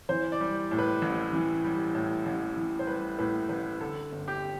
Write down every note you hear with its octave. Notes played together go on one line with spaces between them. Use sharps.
E3 C5
D5
G3
A2
B4
A1
E3
G3
A2
A1
E3
C5
G3 B4
A2 B4
A1 B4
D3 A4
G1
G4